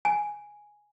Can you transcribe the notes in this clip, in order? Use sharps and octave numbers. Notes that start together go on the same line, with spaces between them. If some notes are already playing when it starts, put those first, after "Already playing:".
G#5